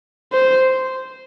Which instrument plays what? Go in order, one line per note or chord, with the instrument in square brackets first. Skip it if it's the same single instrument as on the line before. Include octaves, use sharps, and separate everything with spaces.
[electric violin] C5